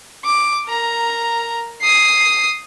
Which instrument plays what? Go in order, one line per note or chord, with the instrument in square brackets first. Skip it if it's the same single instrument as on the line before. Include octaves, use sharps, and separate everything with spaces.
[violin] D6
A#4 A#5
D#6 C7